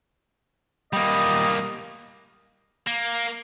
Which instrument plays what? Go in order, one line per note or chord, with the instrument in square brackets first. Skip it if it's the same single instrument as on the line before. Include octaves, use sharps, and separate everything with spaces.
[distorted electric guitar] G3 A#3 [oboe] D#5
[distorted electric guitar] A#3